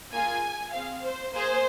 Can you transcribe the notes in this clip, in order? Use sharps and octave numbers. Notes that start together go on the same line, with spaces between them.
A#3 F4 G#4 G#5
C4 G#4 F5
C5
A#3 G#4 C5